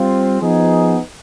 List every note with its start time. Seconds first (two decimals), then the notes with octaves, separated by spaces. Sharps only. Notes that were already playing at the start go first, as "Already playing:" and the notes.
Already playing: G3 C4 F4
0.41 F3 B3 D#4 G#4